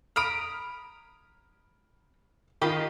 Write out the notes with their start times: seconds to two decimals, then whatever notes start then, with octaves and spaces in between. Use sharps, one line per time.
0.16 A#5 B5 D#6 F6 D7
2.62 D#3 F4 G4 D#5 B5